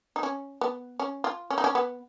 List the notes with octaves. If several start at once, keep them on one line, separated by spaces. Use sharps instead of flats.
D#4
C#4
B3
C#4
F4
C#4
D#4
C#4
B3